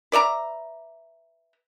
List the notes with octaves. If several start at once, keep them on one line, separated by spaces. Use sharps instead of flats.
B4 D5 E5 A#5